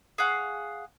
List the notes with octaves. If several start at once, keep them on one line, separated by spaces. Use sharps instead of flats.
G#4 F5 F#5 C#6